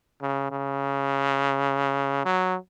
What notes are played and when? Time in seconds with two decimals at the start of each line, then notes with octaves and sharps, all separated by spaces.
0.22 C#3
0.51 C#3
2.25 F#3